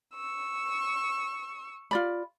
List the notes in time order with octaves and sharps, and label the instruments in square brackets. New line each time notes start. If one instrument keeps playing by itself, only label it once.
[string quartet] C#6 E6
[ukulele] F4 D5 B5